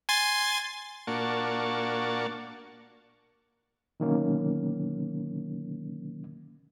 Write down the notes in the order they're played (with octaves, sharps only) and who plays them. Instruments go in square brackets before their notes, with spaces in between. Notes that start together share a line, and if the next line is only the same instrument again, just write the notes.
[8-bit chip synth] G#5 C6 A6
[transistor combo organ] A#2 A#3 D4 F#4 A5 C#6
[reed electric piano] B2 D3 D#3 F#3 A#3 C#4